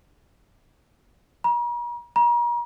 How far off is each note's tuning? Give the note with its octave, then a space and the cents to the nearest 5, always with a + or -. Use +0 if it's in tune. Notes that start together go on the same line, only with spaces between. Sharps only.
A#5 +45
A#5 +40